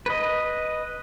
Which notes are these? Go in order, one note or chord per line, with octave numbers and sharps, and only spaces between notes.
B4 D#5